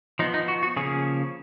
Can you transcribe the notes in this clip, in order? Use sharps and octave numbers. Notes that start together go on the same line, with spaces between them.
F3 B3 D#4
D#4
F#4
F#4
C#3 F3 A#3 C#4 G#4